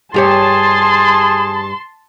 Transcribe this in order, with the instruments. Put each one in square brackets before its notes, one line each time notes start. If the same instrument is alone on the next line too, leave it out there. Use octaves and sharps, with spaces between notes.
[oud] G2 G4 C#5 [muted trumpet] G#4 [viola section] A5 [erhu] C6